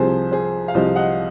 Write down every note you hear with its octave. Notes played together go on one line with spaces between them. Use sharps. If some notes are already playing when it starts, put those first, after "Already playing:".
Already playing: C2 C3 F3 G#4 C5
G#4 C5
F5
C2 C3 F3 C5 D#5
D#5 F#5